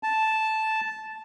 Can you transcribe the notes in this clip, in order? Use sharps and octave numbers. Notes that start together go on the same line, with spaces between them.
A5